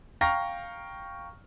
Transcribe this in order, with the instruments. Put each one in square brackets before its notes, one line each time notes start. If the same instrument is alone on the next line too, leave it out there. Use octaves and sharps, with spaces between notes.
[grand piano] F5 G5 A#5 C#6 F6 A#6